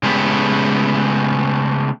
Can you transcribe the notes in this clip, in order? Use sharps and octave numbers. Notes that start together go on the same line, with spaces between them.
C#3 G#3 A3 B3 G4